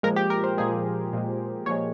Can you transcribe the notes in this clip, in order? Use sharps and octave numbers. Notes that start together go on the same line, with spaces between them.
A#2 F3 G#3 A#4
G4
A#4
C5
A#2 F3 G#3 G#4
A#2 F3 G#3
A#2 F3 G#3 C#5